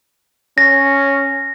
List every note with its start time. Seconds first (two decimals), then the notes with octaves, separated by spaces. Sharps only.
0.58 C#4 A#6